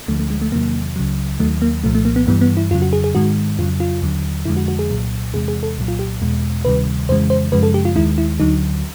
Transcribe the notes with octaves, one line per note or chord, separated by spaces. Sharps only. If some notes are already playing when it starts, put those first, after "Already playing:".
D2 D3 F3 A3
A3
G#3
A3
E2 C3 D#3 F#3 A#3
C#2 C#3 F#3
D#2 D#3 F#3 A3
A#3
C2 A#2 F3 A3
A3
A#3
B3
G2 E3 G3 B3
B3
E4
F2 C#3 F#3 F4
F#4
G#4
G#4
G#2 D#3 G#3 F#4
F2 C#3 F#3 F4
F4
D#2 D3 F#3
F2 D3 F3 G#3 E4
F#4
F#4
G#4
C2 A#2 F#3
E2 C3 E3 G#3 G#4
G#4
A4
C2 A#2 F#3
F4
G4
E2 B2 G#3
D2 C3 D#3 G3 B4
F2 C#3 E3 G#3 C5
C5
F#2 C#3 F3 G#3 B4
A4
G4
F4
D#2 D#3 G#3 E4
E4
D2 D3 F#3 D#4